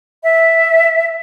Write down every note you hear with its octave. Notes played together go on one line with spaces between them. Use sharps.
E5